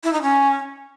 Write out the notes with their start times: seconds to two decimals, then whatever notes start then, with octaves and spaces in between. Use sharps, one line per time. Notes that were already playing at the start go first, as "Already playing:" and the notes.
0.04 E4
0.13 D#4
0.22 C#4